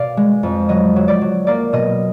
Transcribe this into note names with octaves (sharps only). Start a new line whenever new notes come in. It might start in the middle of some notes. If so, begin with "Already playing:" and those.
Already playing: B2 D5 F5
G#3
F2
F#3 D#5
F#3
D5
F#3
A#3 D5
B2 D#5